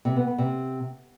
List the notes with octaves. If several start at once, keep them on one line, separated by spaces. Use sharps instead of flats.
C3
B3
B3
C3